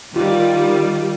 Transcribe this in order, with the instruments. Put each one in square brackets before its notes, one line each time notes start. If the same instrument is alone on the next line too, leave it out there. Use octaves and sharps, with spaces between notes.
[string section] D#3 G3 [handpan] F4